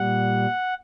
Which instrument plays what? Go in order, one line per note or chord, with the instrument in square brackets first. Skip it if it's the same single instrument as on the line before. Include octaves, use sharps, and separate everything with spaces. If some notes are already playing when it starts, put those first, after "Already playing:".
Already playing: [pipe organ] A#2 G3 F#5